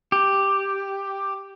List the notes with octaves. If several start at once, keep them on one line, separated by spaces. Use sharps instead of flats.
G4